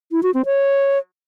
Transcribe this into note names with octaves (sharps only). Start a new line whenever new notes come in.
E4
F#4
C4
C#5